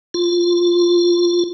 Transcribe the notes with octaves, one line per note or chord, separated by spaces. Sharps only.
F4